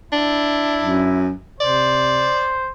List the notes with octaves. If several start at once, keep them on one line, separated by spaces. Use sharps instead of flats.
D4 E4
F#2
C3 C5 D5